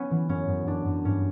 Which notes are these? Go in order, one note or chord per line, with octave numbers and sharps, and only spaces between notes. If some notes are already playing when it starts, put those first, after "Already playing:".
Already playing: B3 C#4
E3
F#2 C#4
F#2
F#2 D4
F#2
G2 C#4